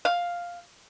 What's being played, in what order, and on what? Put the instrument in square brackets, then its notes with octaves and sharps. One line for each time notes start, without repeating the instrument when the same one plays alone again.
[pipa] F5